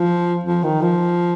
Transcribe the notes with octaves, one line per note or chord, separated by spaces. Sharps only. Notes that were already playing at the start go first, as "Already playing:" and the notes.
Already playing: F3
F3
D#3
F3